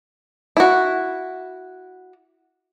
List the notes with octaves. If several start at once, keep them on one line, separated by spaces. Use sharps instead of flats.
E4 F#4